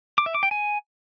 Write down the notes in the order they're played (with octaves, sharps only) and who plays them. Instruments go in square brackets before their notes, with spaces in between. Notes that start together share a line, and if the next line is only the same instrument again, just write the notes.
[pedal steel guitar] D6
E5
D6
G5
G#5